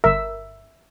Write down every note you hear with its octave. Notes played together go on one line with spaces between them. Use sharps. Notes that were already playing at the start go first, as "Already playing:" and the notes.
G1 A#4 E5